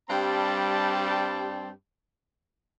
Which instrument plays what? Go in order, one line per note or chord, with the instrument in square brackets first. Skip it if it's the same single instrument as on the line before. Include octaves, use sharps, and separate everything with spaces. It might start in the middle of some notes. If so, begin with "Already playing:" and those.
[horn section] G2 G3 C4 G4 A5